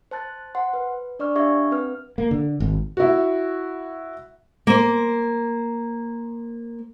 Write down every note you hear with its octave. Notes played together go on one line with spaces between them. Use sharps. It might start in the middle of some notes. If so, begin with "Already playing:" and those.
C5 A5 F#6 A6
C5 F#5 C6
B4
D4 D5 C#6 F6
D4 G4 E5 F5 C#6 G#6
C4 B4 F6
A#3
D3
G#1
E4 F#4
A#3 C5